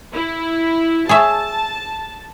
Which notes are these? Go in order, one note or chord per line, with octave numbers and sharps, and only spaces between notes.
E4
G#4 C#5 E5 A5